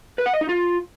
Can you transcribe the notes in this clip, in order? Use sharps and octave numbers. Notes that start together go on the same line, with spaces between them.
B4
F#5
D#5
D#4
F4